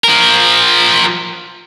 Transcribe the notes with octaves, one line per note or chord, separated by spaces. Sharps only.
F3 A#4